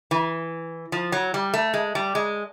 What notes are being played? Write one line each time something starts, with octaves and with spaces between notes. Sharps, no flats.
E3
F3
F#3
G3
A3
G#3
G3
G#3